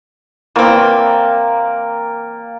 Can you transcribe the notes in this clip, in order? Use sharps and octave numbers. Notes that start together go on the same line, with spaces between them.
E3 A#3 C4 D5